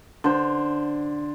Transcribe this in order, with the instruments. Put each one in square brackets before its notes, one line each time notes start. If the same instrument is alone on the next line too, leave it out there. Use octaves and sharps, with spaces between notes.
[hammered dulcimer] D3 C5